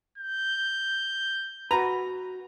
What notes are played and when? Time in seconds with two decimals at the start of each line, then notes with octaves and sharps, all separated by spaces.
0.18 G6
1.71 F#4 B4 A#5